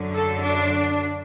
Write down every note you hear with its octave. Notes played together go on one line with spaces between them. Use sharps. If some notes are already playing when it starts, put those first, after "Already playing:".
Already playing: F#2 D3 F#3
A4
D4